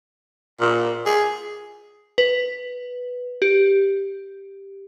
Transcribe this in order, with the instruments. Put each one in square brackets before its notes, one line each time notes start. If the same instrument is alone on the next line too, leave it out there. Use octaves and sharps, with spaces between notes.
[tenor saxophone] A#2
G#4
[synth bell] B4
G4